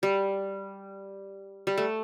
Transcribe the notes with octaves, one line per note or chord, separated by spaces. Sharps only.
G3
G3
A3